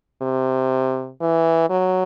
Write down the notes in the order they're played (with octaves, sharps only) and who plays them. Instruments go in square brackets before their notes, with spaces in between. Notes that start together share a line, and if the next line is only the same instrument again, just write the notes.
[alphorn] C3
E3
F#3